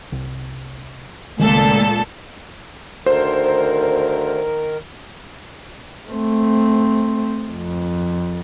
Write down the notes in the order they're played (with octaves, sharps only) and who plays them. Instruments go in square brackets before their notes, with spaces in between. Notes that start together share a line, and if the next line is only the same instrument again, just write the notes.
[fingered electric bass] C2
[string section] C#2 A#2 A4 [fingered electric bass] D#3 G#3 A3
[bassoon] D2 [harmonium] D#3 A#4 [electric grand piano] C5
[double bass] A3 C4
F2